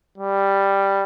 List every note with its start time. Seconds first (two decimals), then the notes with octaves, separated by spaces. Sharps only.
0.18 G3